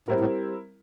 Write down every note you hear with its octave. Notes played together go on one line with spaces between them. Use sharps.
A2 G3 C4 E4 A#4
A2